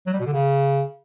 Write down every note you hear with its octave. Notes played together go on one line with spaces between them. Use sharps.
F#3
G3
B2
D3
C#3